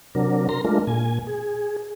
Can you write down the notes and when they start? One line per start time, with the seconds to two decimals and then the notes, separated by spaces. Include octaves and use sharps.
0.15 C3 F#3 D4 A#4
0.49 A#4 A#5 C6
0.65 G#3 A3 D4 F4 A#4
0.87 A#2 G#5
1.27 G#4